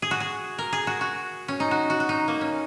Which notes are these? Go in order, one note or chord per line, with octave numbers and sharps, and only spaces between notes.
G#4
F#4
G#4
A#4
G#4
F#4
F#4
C#4
D#4
F#4
F#4
F#4
D#4
A#3
C#4